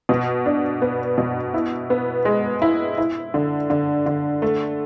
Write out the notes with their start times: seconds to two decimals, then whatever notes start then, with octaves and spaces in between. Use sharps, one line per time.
0.09 B2
0.46 D4
0.82 B3
1.18 B2
1.54 E4
1.90 B3
2.25 G#3
2.62 E4
2.98 E4
3.34 D3
3.70 D3
4.06 D3
4.42 A3